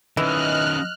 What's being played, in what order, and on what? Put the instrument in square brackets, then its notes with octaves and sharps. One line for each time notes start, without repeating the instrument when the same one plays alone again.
[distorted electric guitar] D#3 C#4 [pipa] E3 [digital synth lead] D#5 [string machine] F6 F#6